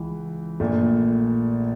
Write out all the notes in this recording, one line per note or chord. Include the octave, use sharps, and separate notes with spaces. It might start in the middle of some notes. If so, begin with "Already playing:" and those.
Already playing: C#2 C#3 E3
A#1 A#2 A3